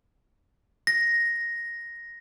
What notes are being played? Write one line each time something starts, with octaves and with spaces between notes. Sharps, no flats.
A#6